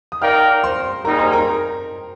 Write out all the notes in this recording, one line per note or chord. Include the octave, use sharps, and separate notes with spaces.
D#6
D#4 A#4 D5 F5 G5 F6
C5 C6
G3 A#3 D#4 G#4 A#4 A#5
C5 C6
A#4 A#5